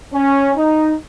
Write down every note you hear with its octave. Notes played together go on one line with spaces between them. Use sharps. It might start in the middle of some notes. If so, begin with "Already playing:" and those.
C#4
D#4